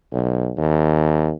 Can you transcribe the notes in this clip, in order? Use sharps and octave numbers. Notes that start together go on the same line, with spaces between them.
B1
D#2